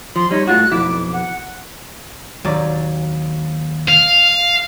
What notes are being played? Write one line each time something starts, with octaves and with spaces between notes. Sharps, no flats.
F3 C6
G3 D#4 C#5
A2 F4 F#4 F#6
B1 F2 E4 D6
F#5
D#2 F#3 D5
F5